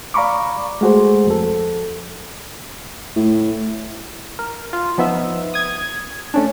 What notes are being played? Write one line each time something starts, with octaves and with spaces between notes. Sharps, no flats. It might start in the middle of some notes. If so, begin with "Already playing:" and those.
D5 F5 A#5 B5 C#6 D6
G#3 A3 F#4 G#4 C5
F2 A4
A2
A#4
F4
F3 B3 D#4 E5
D#6 G#6
A3 C#4 D4